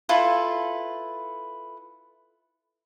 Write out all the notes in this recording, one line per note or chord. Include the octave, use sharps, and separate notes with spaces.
E4 F4 A4 B4